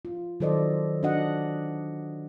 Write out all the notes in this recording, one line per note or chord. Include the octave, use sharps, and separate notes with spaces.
F4
D#3 F#3 A4 C5 D5 D#5
D4 F#4 D#5 F#5